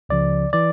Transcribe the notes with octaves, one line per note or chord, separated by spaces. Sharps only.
C#2 C#3 F3 D5
E3 D5